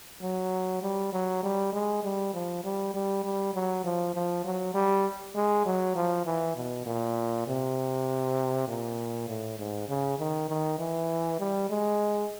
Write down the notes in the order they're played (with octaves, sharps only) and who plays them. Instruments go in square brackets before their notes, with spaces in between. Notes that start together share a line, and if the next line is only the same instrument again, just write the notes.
[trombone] F#3
G3
F#3
G3
G#3
G3
F3
G3
G3
G3
F#3
F3
F3
F#3
G3
G#3
F#3
F3
E3
B2
A#2
C3
A#2
A2
G#2
C#3
D#3
D#3
E3
G3
G#3